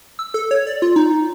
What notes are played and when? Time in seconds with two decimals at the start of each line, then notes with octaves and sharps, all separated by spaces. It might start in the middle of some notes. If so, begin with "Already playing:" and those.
0.19 E6
0.34 A4
0.51 C#5
0.67 D5
0.82 F4
0.96 D#4